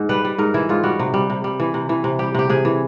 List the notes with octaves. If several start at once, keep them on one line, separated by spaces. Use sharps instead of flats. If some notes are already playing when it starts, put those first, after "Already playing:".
Already playing: G#2
G3 B4
G3
G#2 A#4
E3 E4
G#2 F4
G3 F#4
C3
G3
C3
G3
E3
C3
E3
C3
G3 G4
C3 G4
C3 G#4
E3